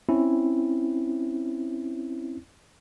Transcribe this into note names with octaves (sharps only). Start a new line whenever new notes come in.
C4 C#4 E4